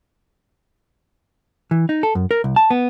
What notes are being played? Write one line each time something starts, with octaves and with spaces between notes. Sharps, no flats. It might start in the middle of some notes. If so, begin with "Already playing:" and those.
E3
D#4
A4
F#2
A#4
C2
A5
B3